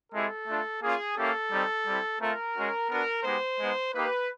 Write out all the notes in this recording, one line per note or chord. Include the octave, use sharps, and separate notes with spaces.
G#3 C4 E4 G4 A4
A3 D4 F4
A#3 C#4 F4 G#4
A#3 C#4 E4 G4 A4
G3 C4 D#4
G3 C4 E4
A3 C4 F4 A#4
G#3 C#4 F#4
B3 D4 F#4 A#4
G#3 B3 D#4 G4 C5
G#3 B3 D#4
A#3 D#4 G4 B4